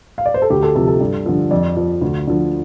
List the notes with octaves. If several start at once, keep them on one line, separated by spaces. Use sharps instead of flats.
F5
D5
C5
A4
D2 G4
A4
C3 F3 A4
A4
G2
D3 F3
F2 D5
F3
D2
D3 F3